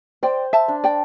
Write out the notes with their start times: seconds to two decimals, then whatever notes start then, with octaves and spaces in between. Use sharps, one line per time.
0.23 C5 D5 G5
0.53 E5 A5
0.68 D4
0.84 D5 G5